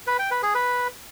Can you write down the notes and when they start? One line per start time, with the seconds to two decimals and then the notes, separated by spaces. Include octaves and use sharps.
0.07 B4
0.19 G5
0.31 B4
0.43 G#4
0.55 B4